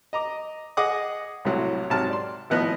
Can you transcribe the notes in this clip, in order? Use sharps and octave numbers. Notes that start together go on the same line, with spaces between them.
D#5 A#5 D6
G#4 D#5 F#5 D6 D#6
C2 A2 C3 F#3
G#2 C3 F#3 A5 F6
D5 C6
G#1 A2 F3 B3 D#5 F#6